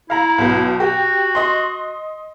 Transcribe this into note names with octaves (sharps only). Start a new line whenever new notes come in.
E4 F5 A#5
B1 B2
F#4 G4
D#5 C6